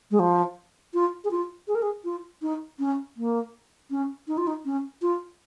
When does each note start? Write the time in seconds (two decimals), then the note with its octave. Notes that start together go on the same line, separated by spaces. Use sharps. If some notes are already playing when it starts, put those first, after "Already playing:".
0.11 G#3
0.19 F3
0.94 F4
1.24 G#4
1.31 F4
1.68 G#4
1.75 A#4
1.82 G#4
2.04 F4
2.42 D#4
2.79 C#4
3.17 A#3
3.91 C#4
4.28 D#4
4.38 F4
4.47 D#4
4.65 C#4
5.02 F4